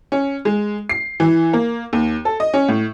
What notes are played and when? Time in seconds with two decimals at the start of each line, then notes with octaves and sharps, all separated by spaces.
0.12 C#4
0.45 G#3
0.89 C7
1.20 E3
1.53 A#3
1.93 D#2
2.25 A4
2.40 D#5
2.54 C#4
2.68 A2